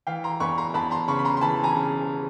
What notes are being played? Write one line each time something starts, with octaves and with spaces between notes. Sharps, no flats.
E3 F5 G5
A#5 C6
E2 B5 C#6
A#5 C6
E2 A5 B5
A#5 C6
C#3 B5 C#6
B5
A#5 C6
C6
E3 A5 B5
G#5 A#5
C#3